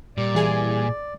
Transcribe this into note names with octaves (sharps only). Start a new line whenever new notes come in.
A#2 G3 D5
E3 G#4 G#5